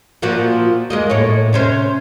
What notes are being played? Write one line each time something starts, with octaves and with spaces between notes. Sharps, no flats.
A#2 F3 F#4
G#3 A#3 D#5
A2 C#5
C3 C#4 C5